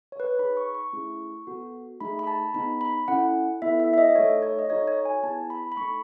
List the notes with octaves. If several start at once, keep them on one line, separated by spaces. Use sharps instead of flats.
C#5
B4
C#5
D#4 G#4 B5
C#6
C#6
A3 C#4 E4 G#4
B3 F#4 A4
A3 D#4 G#4 B5
B5
A5
B3 D#4 G#4 B5
B5
C#4 E4 A4 F#5
B3 E4 A4 E5
E5
E5
D#5
A3 D#4 A4 C#5
C#5
D#5
D#4 F#4 A4 C#5
C#5
G#5
B3 E4 G#4 A5
B5
B5
A3 D#4 A4 C#6